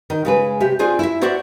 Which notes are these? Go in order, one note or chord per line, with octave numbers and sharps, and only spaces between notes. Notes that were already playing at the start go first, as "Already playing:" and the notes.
D#3
C#3 G#3 B4
C3 G4
C4 D4 F4 G#4 C5
E4 E5
F#4 C5 D5 E5 F#5